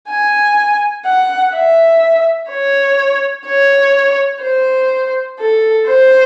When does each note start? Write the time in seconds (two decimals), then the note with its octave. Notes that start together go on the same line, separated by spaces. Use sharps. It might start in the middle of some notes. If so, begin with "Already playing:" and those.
0.09 G#5
1.06 F#5
1.54 E5
2.50 C#5
3.47 C#5
4.43 C5
5.40 A4
5.87 C5